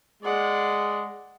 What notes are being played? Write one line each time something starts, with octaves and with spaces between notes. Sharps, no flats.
G#3 D5 F#5